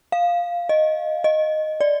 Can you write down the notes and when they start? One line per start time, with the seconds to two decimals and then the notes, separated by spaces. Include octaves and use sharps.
0.12 F5
0.69 D#5
1.24 D#5
1.81 D5